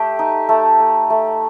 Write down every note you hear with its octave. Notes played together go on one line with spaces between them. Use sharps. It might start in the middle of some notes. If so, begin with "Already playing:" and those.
Already playing: A3 G4
D#4
A3
A3
A3